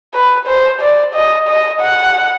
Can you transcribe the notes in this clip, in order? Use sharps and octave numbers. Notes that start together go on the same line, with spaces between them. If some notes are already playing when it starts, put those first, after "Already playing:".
B4
C5
D5
D#5
D#5
F#5